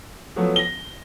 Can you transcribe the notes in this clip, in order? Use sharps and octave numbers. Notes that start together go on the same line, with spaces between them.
F3 F#3 A3 B3 F#4
A#6 G7